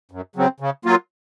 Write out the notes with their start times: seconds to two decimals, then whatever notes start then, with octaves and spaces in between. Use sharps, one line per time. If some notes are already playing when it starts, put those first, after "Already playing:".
0.11 F#2
0.36 C#3 F#3 C4
0.60 C#3
0.85 F#3 A#3 F4